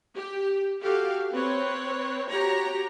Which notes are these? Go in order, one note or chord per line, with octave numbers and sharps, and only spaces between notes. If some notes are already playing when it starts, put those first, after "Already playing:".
G4
F#4 G4 A4 F5
C4 B4 C#5
F#4 G4 C#5 A#5